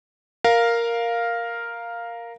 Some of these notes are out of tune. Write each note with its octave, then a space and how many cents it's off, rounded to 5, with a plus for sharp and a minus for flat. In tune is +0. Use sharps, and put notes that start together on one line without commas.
A#4 +0 F5 +0